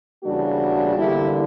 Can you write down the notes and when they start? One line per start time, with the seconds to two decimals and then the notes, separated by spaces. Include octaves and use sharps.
0.24 E2 C#3 G3 A#3 D4 F#4
0.94 E2 D3 G3 A#3 E4 G4